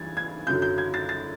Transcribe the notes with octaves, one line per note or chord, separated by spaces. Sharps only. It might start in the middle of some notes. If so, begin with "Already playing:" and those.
Already playing: G2 E3 G#6 A6
G#6
F#2 D3 F#3 G6
G6
G#6
A6
A6